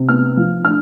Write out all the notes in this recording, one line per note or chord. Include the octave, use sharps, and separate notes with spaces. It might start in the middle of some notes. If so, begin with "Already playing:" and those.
Already playing: C3
B3 F6
F3
D4 F6